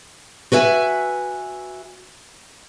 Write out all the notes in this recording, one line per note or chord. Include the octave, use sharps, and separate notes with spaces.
F#4 B4 E5 G#5